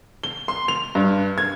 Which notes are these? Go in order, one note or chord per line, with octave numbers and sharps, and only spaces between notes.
G7
C6
F7
G2
G#6